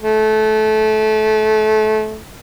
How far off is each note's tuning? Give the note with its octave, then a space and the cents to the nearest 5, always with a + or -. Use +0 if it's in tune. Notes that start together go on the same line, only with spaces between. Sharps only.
A3 -25